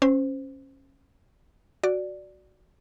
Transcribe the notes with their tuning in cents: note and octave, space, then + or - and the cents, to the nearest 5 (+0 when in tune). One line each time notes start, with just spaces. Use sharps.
C#4 -20 C5 -15
F#4 +0 D5 +0